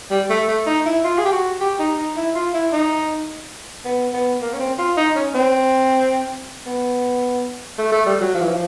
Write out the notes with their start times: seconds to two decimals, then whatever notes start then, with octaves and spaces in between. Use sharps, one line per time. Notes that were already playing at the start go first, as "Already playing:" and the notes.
0.10 G3
0.30 A3
0.48 A3
0.66 D#4
0.86 E4
1.04 F4
1.18 G#4
1.25 G4
1.32 F#4
1.61 G4
1.79 D#4
1.98 D#4
2.16 E4
2.35 F4
2.54 E4
2.73 D#4
3.85 B3
4.14 B3
4.41 A#3
4.53 C#4
4.60 C4
4.79 F4
4.97 D#4
5.16 C#4
5.35 C4
6.66 B3
7.78 A3
7.92 A3
8.06 G3
8.21 F#3
8.35 F3
8.42 E3
8.49 F3